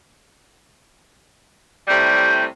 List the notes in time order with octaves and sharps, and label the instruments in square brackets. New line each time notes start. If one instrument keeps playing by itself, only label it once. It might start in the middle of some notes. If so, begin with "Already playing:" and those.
[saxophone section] A2 C3 G3 [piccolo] G6